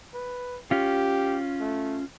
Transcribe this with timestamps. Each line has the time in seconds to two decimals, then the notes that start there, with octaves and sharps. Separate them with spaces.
0.14 B4
0.71 C#4 F4 G4
1.60 A3